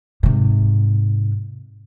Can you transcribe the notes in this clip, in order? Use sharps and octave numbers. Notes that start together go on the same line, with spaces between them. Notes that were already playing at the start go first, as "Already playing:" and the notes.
G#2 C3